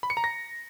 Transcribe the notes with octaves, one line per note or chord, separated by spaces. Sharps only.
B5
C#7
A#5
A#6